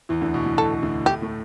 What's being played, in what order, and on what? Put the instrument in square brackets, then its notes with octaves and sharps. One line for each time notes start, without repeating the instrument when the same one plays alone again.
[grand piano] E2 E3
D2 D3
B2
A2
[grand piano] B2 [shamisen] A4
[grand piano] D2 D3
[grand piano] A2 A3 [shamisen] G4
[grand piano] A2 A3